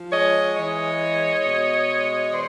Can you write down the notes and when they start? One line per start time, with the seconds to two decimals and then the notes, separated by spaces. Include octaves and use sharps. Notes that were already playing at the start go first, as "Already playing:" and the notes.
Already playing: F3
0.12 G#3 C#5 D#5
0.56 E3 C#5 D#5
1.00 G#3
1.44 B2
1.88 G#3
2.31 E3 C5 D5